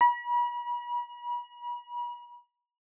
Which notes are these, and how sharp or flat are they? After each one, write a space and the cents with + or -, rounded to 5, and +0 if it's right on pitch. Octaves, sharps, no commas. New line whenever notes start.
B5 -40